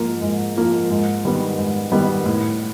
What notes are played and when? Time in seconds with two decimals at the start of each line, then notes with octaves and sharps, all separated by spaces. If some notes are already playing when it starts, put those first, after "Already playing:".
Already playing: G#2 F3 A#3
0.21 G#2
0.57 F3 A#3
0.90 G#2
1.25 D#3 G3 B3
1.58 G#2
1.92 D#3 G3 B3
2.26 A2